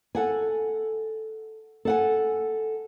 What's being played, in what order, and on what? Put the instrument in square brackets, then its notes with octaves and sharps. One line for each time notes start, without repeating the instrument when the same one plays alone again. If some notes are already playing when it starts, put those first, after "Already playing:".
[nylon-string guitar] A4 F#5 G#5
A4 F#5 G#5